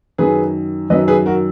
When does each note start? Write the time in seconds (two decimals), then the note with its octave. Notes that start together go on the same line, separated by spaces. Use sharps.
0.18 F#2 D#3 F#3 G#4 B4
0.90 F#2 D#3 F#3 B4 D#5
1.08 G#4 B4
1.26 F#4 A#4